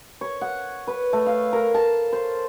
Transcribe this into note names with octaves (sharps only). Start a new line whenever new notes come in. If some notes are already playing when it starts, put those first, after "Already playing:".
C#5
F#5
B4
A3
F5
A#4
A5
C5